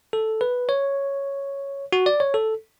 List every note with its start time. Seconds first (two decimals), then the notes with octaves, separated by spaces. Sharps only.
0.13 A4
0.41 B4
0.69 C#5
1.92 F#4
2.06 D5
2.20 C#5
2.34 A4